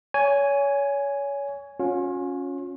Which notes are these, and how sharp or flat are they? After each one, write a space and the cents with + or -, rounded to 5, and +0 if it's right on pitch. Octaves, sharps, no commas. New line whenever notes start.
C#5 +25 G#5 +0
C#4 +0 F4 +45